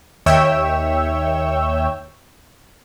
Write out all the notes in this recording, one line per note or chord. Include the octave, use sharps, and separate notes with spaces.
D#2 C#5 E5 G5 E6